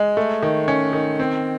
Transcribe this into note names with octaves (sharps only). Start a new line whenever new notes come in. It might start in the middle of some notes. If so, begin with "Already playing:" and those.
Already playing: G#3
A3
D#3
C#4
D#3
C4